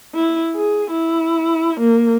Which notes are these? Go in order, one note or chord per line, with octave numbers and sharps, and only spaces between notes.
E4
G#4
E4
A#3